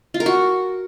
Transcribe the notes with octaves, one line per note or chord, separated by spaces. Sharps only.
F4
A#4
F#4